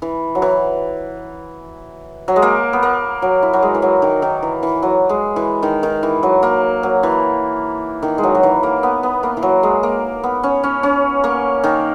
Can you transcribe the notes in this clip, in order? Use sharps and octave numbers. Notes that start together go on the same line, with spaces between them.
E3
F#3
E3
F#3
G#3
A#3
B3
A#3
F#3
E4
F#3
G#3
E3
F#3
D#3
D#3
E3
E3
F#3
G#3
E3
D#3
D#3
E3
F#3
A#3
F#3
E3
D#3
G#3
F#3
F#3
E3
A#3
B3
B3
A#3
E3
F#3
G#3
A#3
B3
C#4
C#4
C#4
A#3
D#3